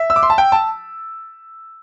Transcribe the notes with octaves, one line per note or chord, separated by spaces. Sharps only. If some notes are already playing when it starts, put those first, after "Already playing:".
Already playing: E5
E6
D6
C6
A5
G5
A5